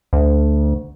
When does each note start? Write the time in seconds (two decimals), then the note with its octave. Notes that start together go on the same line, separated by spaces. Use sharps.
0.13 D2